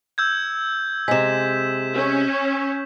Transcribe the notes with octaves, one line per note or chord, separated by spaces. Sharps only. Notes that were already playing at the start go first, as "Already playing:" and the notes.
E6 G6 G#6
C3 G#3 B6 E7
C#4